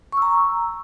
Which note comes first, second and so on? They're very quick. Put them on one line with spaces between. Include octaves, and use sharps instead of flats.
C#6 E6 A#5